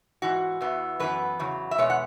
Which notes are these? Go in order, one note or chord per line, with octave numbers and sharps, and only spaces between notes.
G#2 E3 F#4
E2 E3 B3
F#2 E3 B3 B4
E2 C#3 F#3
E5
E2 B2 G#3 B3 C#5
F#5